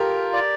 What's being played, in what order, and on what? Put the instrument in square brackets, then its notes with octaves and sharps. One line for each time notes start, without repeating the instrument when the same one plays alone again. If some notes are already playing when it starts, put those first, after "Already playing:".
Already playing: [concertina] F4 [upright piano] G4 A4 A#4
[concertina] D5